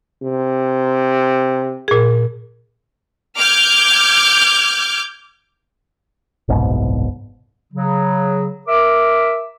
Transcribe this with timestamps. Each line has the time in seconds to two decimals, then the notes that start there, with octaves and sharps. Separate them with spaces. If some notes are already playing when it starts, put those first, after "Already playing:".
0.23 C3
1.88 A#2 G#4
3.37 D6 F6 G6 G#6
6.48 F#1 C2 G#2 B2
7.73 C#3 F#3
8.68 A#4 E5 D6